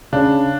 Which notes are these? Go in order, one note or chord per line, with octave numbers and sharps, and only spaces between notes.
C#3 D4